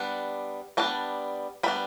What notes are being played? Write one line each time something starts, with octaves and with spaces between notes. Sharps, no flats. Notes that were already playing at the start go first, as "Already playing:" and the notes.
Already playing: G3 B3 D4
G3 B3 D4 A5
G3 B3 D4 B5